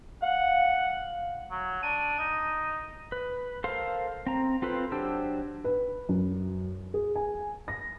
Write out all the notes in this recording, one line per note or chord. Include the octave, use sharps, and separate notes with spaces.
F5 F#5
F#3
D4 D#7
D#4
B4
A4 A#4 C5 F5 C6
C4 A#5
C4 F4 A4 B4 C5
F#3 D4 G4 C5 E6
B4
F#2
G#4
G#5
A#6